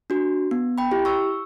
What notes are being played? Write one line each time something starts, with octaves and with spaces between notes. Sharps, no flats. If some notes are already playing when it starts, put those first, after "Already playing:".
D4 F#4
B3
G5 B5
E4 G4
C#6 E6